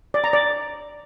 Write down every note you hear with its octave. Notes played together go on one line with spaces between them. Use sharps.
D5
A#5
D5